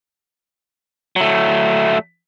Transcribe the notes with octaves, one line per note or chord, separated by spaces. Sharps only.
F#3 A3